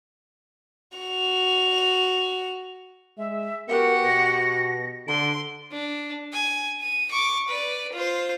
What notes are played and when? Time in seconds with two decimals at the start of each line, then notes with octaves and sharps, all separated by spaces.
0.97 F#4 F7
3.18 G#3 E5
3.69 B3 F#4 G4 A#4 F#5 C#7
4.04 B2 A#6
5.08 D3 A4 C6 D7
5.72 D4
6.33 G#5
6.81 D#7
7.11 C#6 D6
7.49 B4 D5
7.93 F4 C5